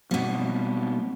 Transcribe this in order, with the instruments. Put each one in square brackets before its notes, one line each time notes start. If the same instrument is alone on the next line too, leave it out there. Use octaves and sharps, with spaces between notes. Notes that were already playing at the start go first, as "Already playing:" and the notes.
[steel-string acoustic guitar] B2 G3 [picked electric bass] F#3 A#3 C4